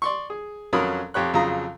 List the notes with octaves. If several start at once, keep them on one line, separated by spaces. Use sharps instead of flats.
D5 C6 C#6
G#4
F2 F#3 C#4 A#4 B5 D#6
F2 G4 C#5 F#6
F2 C#3 F3 F#3 A#5 D#6